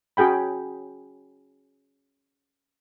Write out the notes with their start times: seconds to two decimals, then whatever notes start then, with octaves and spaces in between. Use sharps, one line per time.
0.17 C#4 F#4 G#4 G5 B5